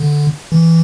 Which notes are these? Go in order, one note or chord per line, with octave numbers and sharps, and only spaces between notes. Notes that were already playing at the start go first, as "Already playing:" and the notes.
Already playing: D3
E3